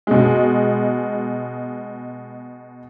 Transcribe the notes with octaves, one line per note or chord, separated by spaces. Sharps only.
B2 G#3